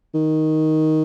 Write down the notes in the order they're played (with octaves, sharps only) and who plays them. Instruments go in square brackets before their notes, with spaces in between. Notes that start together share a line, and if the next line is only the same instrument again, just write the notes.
[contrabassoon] D#3